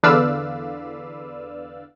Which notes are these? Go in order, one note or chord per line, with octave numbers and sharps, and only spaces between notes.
E2 D3 B4 D5 F5 E6